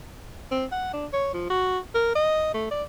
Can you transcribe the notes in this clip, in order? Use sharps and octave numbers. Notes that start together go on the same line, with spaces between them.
C4
F#5
D4
C#5
F3
F#4
A#4
D#5
A3
D5